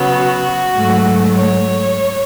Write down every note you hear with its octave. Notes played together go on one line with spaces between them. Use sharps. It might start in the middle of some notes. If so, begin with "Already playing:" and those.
Already playing: C#3 F#3 B3
F#4
G#2 F#3 A3
C#5